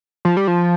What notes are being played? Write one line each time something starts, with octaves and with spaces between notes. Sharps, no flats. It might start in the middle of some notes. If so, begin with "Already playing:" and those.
F3
G3
F3